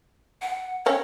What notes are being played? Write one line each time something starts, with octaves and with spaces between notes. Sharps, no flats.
F#5
C4 C#4 C#5 E5